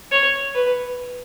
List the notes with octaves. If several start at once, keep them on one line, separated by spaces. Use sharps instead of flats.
C#5
B4